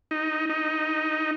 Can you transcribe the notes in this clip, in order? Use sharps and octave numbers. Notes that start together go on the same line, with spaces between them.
D#4
D#4